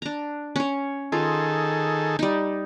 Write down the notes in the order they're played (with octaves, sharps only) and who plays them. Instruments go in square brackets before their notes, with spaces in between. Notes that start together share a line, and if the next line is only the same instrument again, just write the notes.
[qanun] D4 A#5
C#4 C#5
[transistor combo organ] D#3 G#4 A4 [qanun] F4
[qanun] G3 D#4